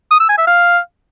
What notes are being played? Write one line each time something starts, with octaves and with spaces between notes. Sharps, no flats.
D#6
E6
G#5
E5
F5